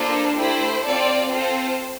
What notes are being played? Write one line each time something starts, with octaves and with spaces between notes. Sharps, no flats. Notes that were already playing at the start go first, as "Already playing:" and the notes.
Already playing: A#3 D4 F4 A4 C5
A3 E4 G4 C5
C4 F4 A4 D5
C4 F4 A4 C5